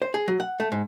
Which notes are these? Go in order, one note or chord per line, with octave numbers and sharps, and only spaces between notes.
C5
G#4
F#3
F#5
A3
G#2